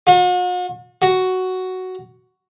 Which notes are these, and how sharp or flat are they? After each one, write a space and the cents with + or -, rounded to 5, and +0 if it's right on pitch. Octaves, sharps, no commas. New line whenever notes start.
F#4 -45
F#4 +5